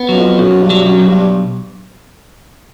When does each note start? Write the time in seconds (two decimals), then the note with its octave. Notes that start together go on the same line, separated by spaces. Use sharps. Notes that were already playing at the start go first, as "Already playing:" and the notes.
Already playing: B3
0.09 F#2 F#3
0.16 F2
0.39 B1 F#2
0.62 G2
0.70 F#3
0.85 F#2
1.00 B1
1.08 G2